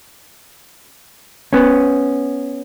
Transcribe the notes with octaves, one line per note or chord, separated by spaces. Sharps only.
B3 C#4